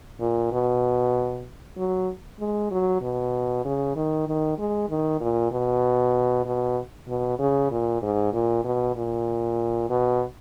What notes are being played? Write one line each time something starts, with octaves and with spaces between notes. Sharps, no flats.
A#2
B2
F#3
G#3
F#3
B2
C#3
D#3
D#3
G#3
D#3
A#2
B2
B2
B2
C#3
A#2
G#2
A#2
B2
A#2
B2